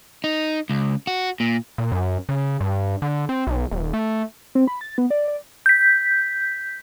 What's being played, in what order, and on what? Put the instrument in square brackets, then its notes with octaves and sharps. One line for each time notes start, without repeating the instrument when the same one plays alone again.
[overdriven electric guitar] D#4
C#2
F#4
A#2
[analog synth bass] A#2
F#2
C#3
G2
D3
C4
B1
D#1
A3
[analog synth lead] C4
B5
A6
B3
D5
D5
[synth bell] G6 B6